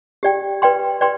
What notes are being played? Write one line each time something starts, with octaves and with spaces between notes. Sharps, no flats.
G4 D5 G5
B4 D5 G5 C6
B4 D5 G5 C6